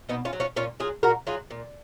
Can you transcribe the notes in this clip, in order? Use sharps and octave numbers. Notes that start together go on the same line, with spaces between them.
B2 B3 D#4
C#4 F4
F#3
C#4 F4
A#2 C#4 F4
F#3 F4 G#4
A#2 F#4 A#4
F#3 F4 G#4
A#2